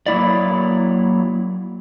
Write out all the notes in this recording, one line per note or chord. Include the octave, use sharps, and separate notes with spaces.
F#3 A#3 E4 D5